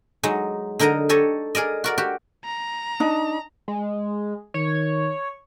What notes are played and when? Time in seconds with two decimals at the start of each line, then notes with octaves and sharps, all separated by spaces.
0.23 F#3 G#3 D#4
0.79 D3 D#4 A#4 D#5 A#5
1.09 G4 A4 C#5 D#5
1.55 G#4 A#4 D5 D#5
1.84 F#4 A#4 D5
1.98 F#4 G4
2.45 A#5
3.00 D4 D#4
3.68 G#3
4.54 D#3 C#5